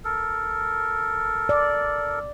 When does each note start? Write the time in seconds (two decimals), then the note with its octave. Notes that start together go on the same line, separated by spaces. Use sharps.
0.05 A4 A#4
1.49 D5